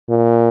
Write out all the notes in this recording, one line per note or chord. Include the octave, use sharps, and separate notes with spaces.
A#2